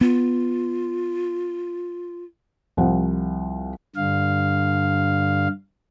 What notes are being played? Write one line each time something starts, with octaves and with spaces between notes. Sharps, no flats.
B3 F4
C2 F3 F#5
G2 D3 F5